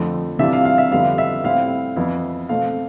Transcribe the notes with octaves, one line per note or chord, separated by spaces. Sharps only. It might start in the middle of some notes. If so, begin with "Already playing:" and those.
Already playing: F2 D3 F3 A3
C3 E3 G3 D4 F4 E5
F5
F5
E5
F2 D3 G3 B3 F5
E5
A2 G3 C4 E4 F5
F2 E3 B3 E4
B2 A3 C4 F5